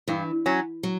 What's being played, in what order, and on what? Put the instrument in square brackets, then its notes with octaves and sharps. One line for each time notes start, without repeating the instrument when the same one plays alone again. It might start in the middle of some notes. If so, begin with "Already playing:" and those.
[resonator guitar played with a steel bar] G2 [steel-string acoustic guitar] E3
[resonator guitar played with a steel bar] F#3 C#4
[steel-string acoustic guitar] F#3